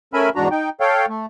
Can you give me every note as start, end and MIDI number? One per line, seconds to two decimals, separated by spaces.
0.14 0.29 57
0.14 0.29 61
0.14 0.29 70
0.14 0.29 76
0.14 0.29 80
0.14 0.29 83
0.36 0.48 40
0.36 0.48 44
0.36 0.48 62
0.36 0.48 66
0.36 0.48 82
0.51 0.69 63
0.51 0.69 79
0.80 1.06 69
0.80 1.06 73
0.80 1.06 77
0.80 1.06 79
1.09 1.26 57